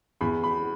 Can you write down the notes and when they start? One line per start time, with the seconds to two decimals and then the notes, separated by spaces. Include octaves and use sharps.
0.21 E2 B5
0.44 B5